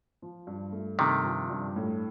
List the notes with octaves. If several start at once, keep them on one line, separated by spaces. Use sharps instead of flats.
F3
G2
A3
G2 C3 D#3
F3
G2
A2